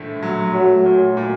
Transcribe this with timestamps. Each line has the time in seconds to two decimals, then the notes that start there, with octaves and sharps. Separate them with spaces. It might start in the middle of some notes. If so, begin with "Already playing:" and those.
Already playing: A#1 A2 A3
0.22 F#3
0.53 F#3 A3
0.85 A#2
1.17 A#2